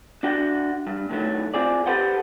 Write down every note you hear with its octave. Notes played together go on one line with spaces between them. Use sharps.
D4 F#4 G5
G2
A2 D#3 F#3 A3
C4 F4 G#4 D5
G4 A4 B4 C5 F#5 G5